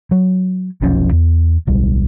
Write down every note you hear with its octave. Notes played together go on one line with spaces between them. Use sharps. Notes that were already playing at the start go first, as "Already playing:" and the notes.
F#3
F1 B1 F3 C#4
E2
D1 B1 G3